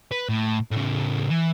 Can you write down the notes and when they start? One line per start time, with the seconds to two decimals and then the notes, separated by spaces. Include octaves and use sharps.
0.12 B4
0.29 A2
0.71 A2 C#3
1.30 E3